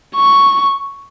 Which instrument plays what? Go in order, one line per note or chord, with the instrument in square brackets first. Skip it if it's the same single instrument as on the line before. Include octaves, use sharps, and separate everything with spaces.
[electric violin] C#6